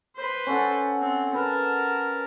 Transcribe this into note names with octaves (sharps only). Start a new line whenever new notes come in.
B4 C5
C#4 A4 F#5
C4
A#4 B4 A5